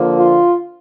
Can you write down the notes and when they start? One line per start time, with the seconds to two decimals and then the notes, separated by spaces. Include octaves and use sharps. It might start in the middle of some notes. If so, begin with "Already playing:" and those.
Already playing: D3 F3 A#3
0.17 F4